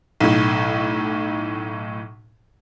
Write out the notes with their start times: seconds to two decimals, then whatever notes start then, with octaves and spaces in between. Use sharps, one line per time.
0.21 B1 A2